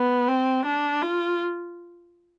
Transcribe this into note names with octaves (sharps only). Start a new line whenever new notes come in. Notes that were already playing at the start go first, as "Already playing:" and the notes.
Already playing: B3
C4
D4
F4